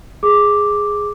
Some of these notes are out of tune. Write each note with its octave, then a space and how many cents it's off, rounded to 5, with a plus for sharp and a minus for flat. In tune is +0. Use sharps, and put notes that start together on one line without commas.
G#4 -5 D6 +0